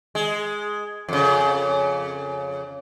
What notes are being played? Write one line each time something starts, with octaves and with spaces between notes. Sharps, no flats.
G#3
F2 C#3